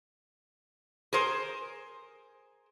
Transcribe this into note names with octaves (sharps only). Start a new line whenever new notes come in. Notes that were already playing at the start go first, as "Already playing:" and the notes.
G#4 A#4 C5